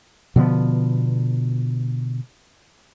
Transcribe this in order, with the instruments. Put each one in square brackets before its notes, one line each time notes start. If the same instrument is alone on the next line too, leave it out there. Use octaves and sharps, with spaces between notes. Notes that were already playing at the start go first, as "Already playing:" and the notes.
[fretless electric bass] B2 D3 F3 B3